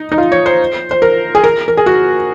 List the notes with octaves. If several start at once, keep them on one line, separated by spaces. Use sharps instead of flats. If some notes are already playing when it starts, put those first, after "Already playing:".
Already playing: D#4
D#4
F4
C#5
C5
C5
A#4
G#4
A#4
A#4
G#4
F#4